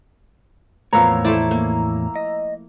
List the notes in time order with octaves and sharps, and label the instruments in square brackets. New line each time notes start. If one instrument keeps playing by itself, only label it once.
[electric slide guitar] E2 A2 C#5 [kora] F3 A#3 B3 [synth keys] A#5 E6
[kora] A3 C5 D5 [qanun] E4 A5
[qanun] A#3
[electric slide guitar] D#5